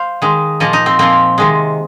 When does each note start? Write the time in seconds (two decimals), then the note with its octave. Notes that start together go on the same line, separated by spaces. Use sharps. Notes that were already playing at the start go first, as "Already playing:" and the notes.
Already playing: C5 F5
0.22 D#3 G#3
0.60 A#2 F3 A#3 D#5
0.73 D#4
0.86 C4
0.99 A#2 F3 A#3 C4
1.38 C3 D#3 G#3